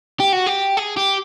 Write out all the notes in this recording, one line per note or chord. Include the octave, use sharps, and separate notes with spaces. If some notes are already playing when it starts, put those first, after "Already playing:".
G4
F#4
G4
G#4
G4